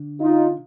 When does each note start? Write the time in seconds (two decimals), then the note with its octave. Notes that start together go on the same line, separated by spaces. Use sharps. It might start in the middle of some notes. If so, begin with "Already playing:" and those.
Already playing: D3
0.21 D#4 F4